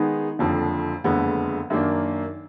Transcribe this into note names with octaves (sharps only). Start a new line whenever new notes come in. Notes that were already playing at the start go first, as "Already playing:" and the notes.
Already playing: D#3 G#3 B3 D#4 G#4
F#1 F2 D3 F3
F#1 F2 D3 G#3 B3
F#2 D#3 A#3 D4